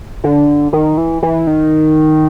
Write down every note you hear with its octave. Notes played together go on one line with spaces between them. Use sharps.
D3
D#3
E3
E3
D#3